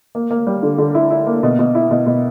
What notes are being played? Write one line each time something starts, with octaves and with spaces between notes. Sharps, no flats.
A#3
A#3
G3
D3
D3
E4
E4
A#3
B2
B2
E4
B2
B2